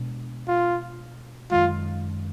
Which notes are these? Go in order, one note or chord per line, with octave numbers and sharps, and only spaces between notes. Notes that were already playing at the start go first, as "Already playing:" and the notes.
Already playing: B2 G#3 D4
F4
F#2 D#3 G#3 F4